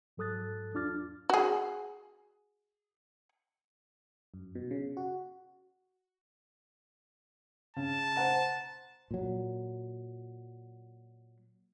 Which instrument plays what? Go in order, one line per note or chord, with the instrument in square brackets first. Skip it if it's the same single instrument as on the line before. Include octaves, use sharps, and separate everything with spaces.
[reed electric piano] G#2 F#3 A4 D#6 F#6 A6
E2 D4 F4 D6 F6 A6
[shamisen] F#4 G#4
[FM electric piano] F#2
B2
C#3
F#4
[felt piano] C#3 [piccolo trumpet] A5
[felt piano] C5 F#5 A#5
[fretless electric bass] A#2 F#3